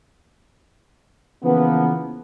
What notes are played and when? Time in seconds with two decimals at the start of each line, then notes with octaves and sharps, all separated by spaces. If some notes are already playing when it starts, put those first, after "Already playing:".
1.43 C#3 E3 F3 A#3 B3